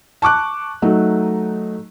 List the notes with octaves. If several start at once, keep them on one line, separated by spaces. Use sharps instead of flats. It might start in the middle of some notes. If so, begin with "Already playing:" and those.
A5 C#6 D6 F#6
F#3 A3 D#4